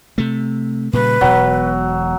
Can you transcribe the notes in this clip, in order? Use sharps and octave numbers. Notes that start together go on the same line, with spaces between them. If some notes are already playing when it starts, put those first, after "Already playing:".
C3 A3
A#2 C#3 G3 B4
E1 B2 F#3